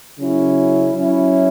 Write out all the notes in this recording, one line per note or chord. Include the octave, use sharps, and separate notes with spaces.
C#3 F#3 C#4 E4
F#3 C#4 E4